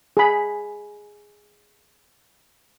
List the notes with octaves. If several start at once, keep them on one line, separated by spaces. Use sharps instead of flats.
G#4 B5